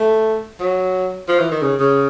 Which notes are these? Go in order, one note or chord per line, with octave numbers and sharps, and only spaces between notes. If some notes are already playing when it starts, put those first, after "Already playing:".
Already playing: A3
F#3
F3
E3
D#3
C#3
C#3